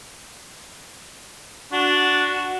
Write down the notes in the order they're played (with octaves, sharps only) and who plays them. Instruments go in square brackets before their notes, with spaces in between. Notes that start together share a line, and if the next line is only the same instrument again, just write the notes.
[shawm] D4 [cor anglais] F#4